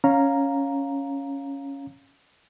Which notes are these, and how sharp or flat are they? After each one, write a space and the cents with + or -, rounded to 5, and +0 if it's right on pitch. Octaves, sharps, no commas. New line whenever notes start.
C#4 +0 F5 +10 A#5 +0